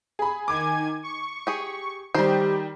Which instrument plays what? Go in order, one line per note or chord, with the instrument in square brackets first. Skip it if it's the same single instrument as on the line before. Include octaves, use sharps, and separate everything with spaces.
[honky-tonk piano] G#4 B5
[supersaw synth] D#3 G#5 G#6 [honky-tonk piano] D6
[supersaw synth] C#6
[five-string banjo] G4 G#4
[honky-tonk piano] D#3 G3 [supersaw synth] G4 [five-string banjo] C5